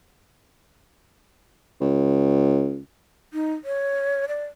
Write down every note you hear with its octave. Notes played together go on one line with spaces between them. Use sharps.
C#2
D#4
C#5
D5